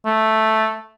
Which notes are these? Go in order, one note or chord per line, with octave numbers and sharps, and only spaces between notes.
A3